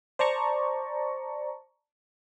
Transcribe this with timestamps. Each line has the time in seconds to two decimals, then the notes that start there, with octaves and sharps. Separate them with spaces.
0.19 C5 D5 A5 A#5 C#6